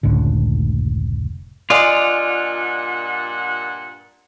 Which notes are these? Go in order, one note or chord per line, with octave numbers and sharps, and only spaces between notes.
F1 C#2 A2 D3
G2 A#2 F4 D5 D#5 F#5 G#5 D#6